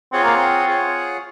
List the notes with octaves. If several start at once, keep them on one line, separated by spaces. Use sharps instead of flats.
C4 F4 G#4 C#5 F#5
A#3
C4
F4 G#4 C#5 F#5